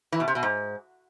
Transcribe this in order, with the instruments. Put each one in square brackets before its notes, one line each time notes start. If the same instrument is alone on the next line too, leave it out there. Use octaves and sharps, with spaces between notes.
[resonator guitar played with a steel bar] E3
B2
C3
B2
G#2